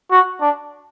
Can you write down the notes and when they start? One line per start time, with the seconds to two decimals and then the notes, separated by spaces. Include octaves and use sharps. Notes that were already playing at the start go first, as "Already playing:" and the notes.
0.11 F#4
0.41 D4